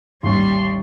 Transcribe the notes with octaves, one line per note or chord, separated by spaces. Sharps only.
A1 D#2 G3 C6 C#6